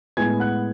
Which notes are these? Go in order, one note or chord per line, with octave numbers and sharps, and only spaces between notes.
A2 G#3 B3 G#5 G#6
F#5 F#6